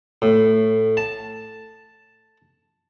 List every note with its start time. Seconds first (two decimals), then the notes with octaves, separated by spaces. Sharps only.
0.22 A2
0.97 A5